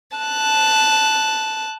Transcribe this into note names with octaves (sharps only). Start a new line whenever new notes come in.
A5 F#6